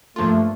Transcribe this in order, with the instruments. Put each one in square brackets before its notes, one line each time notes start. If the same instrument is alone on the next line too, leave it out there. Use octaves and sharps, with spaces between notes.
[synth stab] G2 F3 A#3 D4 F4 [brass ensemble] A3